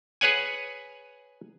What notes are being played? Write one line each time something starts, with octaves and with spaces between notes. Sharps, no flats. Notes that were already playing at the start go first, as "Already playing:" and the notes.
G#4 B4 C#5 F#5 G#5